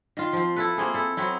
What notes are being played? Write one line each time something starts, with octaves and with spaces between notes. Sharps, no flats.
D#3 F4
F3 C4
E4 A4 B4
A#3 C4 G#4
E4 A4
F#3 B3 C4 E4